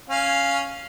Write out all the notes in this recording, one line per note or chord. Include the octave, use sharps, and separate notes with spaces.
C#4 F5